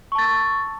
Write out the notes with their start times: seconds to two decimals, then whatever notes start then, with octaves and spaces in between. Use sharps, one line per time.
0.12 C#6
0.15 A5
0.18 A6
0.22 E6